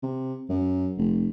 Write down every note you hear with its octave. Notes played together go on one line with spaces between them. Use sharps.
C3
F#2
F1